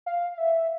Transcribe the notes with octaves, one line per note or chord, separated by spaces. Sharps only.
F5
E5